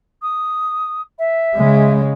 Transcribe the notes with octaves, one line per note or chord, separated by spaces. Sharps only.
D#6
E5
C#3 G#3